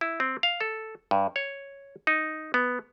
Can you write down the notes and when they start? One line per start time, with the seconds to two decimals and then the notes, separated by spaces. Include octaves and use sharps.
0.01 E4
0.20 C4
0.43 F5
0.61 A4
1.11 G2
1.36 C#5
2.07 D#4
2.54 B3